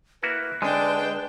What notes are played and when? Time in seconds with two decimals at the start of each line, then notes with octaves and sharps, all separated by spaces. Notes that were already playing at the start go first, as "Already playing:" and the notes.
0.23 A#3 E4 F#4 B4
0.62 D3 G#3 D4 G5